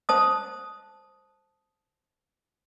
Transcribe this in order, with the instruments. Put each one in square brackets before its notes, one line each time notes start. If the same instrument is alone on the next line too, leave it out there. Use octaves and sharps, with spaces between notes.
[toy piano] C5 A5 D#6